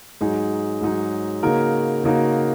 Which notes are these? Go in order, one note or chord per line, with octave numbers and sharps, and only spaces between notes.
G#2 F#3 D#4 G#4
G#2 F#3 D#4 G#4
C#3 A#3 D#4 F#4 A#4
C#3 A#3 D#4 F#4 A#4